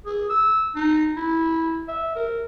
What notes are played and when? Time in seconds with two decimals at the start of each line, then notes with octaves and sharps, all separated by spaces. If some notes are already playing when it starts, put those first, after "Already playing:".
0.06 G#4
0.29 E6
0.76 D#4
1.16 E4
1.88 E5
2.16 A#4